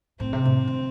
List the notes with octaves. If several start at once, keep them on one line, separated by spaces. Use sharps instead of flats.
A2 C4
C3
A2
D3